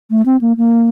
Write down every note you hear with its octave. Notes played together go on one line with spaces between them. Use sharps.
A3
C4
A#3
A#3